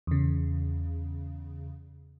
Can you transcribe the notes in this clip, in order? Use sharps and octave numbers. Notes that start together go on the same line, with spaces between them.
E2 C#3